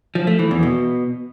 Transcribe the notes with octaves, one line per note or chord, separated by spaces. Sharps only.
F3
A3
E3
E2
B2